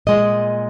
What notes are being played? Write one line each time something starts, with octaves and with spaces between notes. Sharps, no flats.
A#2 G#3 D#5